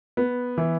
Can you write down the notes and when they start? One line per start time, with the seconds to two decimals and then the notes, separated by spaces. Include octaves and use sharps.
0.17 B3
0.57 E3